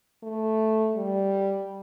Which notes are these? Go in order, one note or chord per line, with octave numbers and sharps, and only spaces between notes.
A3
G3